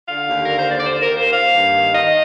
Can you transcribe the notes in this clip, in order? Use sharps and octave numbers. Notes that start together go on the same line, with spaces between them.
D3 F5
D#2
D3 A#4
C5
D#2 D5
D5
C5
D#2
A#4
A#3
C5
A#3 F5
G2
D#3
D#3 D#5